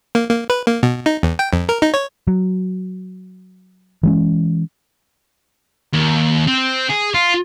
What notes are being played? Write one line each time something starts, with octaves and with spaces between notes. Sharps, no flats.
A#3
A#3
B4
A#3
B2
D#4
E2
G5
F2
A#4
D#4
C#5
F#3
E3 G#3 C#4
D#2
C4
G#4
F4